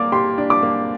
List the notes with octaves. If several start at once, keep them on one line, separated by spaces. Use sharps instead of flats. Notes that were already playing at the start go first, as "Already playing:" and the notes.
Already playing: A#3 D5 D6
G4 C6
D4
D6
A#3